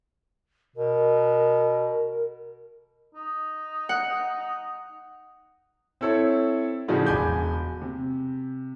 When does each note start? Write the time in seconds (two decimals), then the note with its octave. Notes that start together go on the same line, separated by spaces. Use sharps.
0.76 B2 A#4
3.15 D#4
3.89 F#5
6.01 C4 E4 A4 C#5
6.88 A2 C#3 F3 D4 F#4 G#4
7.06 E1 G#3 G#5 B5 D6 G6
7.82 C3